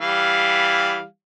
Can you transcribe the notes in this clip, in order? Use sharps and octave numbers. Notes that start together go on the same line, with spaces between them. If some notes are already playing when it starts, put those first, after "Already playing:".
E3 G3 F5